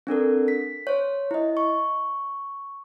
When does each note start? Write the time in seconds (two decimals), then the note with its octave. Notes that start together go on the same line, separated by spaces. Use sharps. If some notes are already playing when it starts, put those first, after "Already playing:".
0.07 C4 D4 A4 A#4
0.48 B6
0.87 C5 C#5
1.31 E4 D#5
1.57 C#6